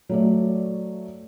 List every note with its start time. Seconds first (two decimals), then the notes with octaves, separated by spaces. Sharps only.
0.09 F#3 A3 D5